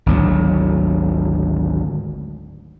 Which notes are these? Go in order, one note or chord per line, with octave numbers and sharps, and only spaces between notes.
G#1 D2 F#3